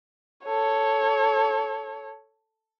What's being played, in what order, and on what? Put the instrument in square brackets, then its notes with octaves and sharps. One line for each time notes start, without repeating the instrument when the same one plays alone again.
[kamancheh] A4 C#5